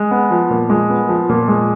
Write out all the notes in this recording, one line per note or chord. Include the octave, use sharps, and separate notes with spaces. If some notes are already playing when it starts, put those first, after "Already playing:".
Already playing: G#3
B3
F3
A#2
G#3
B3
F3
A#2
G#3